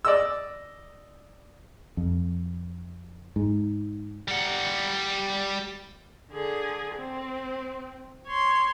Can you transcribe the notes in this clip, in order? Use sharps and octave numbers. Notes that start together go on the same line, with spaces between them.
D5 D#5 E6
F2
G#2
G3 F#5
D3 G#4
C4
C#5 C6